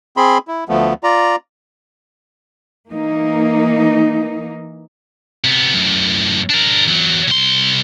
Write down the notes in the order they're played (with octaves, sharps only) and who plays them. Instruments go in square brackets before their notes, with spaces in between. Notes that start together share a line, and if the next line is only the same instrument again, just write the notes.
[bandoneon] C4 G#4 B5 C6
E4
D2 F3 A3 B3
F4 D5 A#5
[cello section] E3 A#3 D#4
[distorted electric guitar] C3 B3
F#2 A2
D4 A#4
E2 F#3
C2 C6